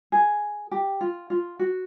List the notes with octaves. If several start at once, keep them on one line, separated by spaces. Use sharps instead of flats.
G#4
G4
F4
F4
F#4